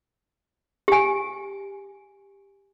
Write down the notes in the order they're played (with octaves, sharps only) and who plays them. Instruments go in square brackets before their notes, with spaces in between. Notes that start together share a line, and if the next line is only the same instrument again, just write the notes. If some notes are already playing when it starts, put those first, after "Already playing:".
[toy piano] G4 G#5